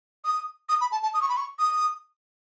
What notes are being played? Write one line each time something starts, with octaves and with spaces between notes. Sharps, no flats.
D#6
D#6
B5
A5
A5
D#6
C#6
B5
C#6
D#6